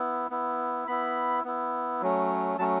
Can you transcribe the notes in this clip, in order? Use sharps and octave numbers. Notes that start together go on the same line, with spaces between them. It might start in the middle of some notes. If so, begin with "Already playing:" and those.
Already playing: B3 E4
B3 E4
B3 E4 B5
B3 E4
F#3 A3 C#4
F#3 A3 C#4 A5